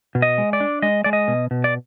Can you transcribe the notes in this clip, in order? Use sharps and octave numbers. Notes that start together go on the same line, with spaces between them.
B2
D#5
G#3
D5
D4
G#3 D#5
G#3 D5
D#5
B2
B2
D5